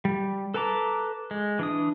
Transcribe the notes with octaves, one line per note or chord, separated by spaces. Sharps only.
G3
A4 B4 A5 A#5 D6
G#3
E3 D4 D#6